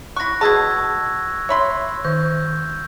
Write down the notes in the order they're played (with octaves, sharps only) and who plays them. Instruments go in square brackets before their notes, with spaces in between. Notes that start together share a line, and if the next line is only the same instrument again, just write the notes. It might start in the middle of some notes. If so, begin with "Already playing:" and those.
[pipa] E4 C#6 [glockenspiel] F#6 A#6
[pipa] B2 D#5 A5 [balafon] G#4 [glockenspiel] C#6 E6 G#6
[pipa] C#5 B5 C6 [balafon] E5
[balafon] D#3 [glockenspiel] G6